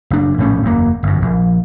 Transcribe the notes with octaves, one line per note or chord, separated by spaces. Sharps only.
F#1 D4
A#1 A2 G3 C#4
F#1 E2 A#3
G1 F#2
A#1